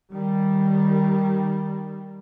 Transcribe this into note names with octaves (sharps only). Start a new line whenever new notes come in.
D#3 G3